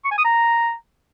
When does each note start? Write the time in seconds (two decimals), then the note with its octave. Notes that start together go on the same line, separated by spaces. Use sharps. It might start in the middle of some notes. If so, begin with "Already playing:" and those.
0.05 C#6
0.11 G#5
0.18 D#6
0.24 A#5